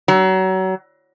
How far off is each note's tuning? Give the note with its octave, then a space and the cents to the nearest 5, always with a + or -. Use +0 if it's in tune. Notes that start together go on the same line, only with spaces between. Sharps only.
F#3 +30